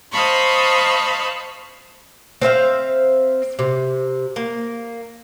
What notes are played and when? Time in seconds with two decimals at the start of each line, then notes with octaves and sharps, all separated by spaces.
0.13 C5 D#5 F5 A5 B5 C#6
2.41 C4 C5 E5 F5
3.59 C3
4.36 A#3